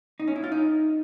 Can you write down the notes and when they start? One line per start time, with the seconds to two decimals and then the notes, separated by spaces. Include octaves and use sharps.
0.20 D#4
0.28 C#4
0.36 E4
0.44 F4
0.52 D#4